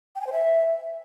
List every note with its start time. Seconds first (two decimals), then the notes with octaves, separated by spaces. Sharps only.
0.15 G5
0.21 G#5
0.27 C5
0.32 E5